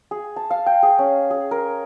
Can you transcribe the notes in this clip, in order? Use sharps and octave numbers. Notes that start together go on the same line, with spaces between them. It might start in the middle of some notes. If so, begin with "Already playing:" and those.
G#4
A5
F5
G5
G#4
C#4
G#4
A#4